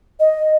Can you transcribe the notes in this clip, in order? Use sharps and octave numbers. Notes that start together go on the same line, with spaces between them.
D#5